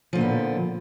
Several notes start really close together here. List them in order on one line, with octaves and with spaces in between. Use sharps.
F3 D3 A#2 B3